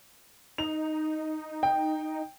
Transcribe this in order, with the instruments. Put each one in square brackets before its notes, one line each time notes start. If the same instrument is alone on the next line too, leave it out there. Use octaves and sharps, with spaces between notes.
[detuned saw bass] D#4 [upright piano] F7
[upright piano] G5